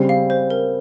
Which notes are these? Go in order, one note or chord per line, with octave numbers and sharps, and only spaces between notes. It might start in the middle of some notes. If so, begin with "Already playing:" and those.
Already playing: C#3 G3 C4
F5
C5
A#4